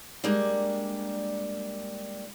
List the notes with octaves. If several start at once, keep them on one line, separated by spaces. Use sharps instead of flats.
G3 G#3 A#3 D4